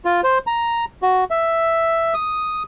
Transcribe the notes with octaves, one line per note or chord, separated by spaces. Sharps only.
F4
C5
A#5
F#4
E5
D#6